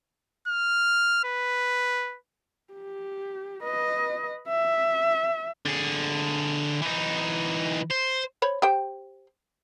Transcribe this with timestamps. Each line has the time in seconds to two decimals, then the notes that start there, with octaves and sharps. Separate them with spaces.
0.48 F6
1.24 B4
2.73 G4
3.63 B4 D#5
4.48 E5
5.66 D3 G#4
6.82 E3 D#4
7.91 C5
8.42 C5 C#5 B5
8.62 G4 C5 G5